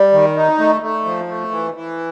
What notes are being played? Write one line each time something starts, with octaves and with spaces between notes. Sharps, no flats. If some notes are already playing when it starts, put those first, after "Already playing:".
Already playing: G3
D#3
D#4
A3
A3
F3
A3
E3
E3